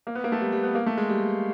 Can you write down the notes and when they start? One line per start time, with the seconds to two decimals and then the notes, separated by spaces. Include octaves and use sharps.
0.07 A#3
0.15 B3
0.24 A#3
0.32 A3
0.41 G3
0.52 G3
0.63 B3
0.75 A#3
0.86 A3
0.97 G#3
1.09 G3